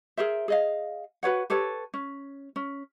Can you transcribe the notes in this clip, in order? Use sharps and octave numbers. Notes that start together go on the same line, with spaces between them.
G#4 A#4 C5 E5
G#4 D#5 F5
F#4 B4 C#5 F#5
G4 A4 B4 C#5
C#4
C#4